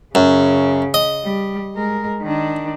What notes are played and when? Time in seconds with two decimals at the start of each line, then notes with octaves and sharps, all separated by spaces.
0.15 F#2 C#3
0.94 D#5
1.23 G3
1.75 G#3 A#4
2.22 D#3 D4